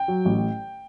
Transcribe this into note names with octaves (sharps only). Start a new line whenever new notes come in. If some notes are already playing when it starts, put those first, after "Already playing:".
Already playing: G5
F#3
A1